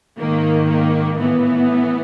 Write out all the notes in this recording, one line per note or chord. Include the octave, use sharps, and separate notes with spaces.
G#2 D#3 A#3
A#3
A2 E3 B3